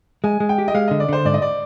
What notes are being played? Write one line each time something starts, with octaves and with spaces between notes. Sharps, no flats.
G#3 G#5
G#3
G5
G4
D#5
G#3 F5
D3 D#5
D5
D3 C5
G#2 D5
D#5
D5